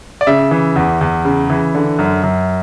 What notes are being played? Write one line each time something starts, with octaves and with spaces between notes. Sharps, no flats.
D5
C#3 E5
E3
E2
E2
C#3
E3
D3
F#2
F#2